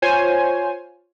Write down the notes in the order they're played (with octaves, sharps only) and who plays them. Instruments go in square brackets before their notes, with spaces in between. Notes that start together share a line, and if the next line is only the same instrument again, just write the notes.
[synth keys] F4 C5 C#5 G#5